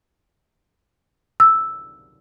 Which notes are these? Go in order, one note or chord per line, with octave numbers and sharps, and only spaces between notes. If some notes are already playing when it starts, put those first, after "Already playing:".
E6